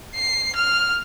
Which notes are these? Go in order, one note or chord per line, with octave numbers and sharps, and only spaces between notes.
C7
F6